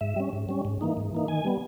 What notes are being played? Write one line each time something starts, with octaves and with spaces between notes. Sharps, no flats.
G#2 E5
G3 C#4
G#2
G3 C#4
G#2
E3 A#3 D#4
G#2
E3 A#3 D#4
D#3 G#5
G3 B3